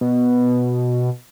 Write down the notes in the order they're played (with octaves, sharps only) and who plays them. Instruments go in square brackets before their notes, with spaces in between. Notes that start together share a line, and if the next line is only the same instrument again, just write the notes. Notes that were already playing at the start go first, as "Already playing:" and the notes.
[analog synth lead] B2